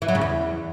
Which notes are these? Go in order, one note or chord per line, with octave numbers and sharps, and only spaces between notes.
E3
F#3
C#3
E2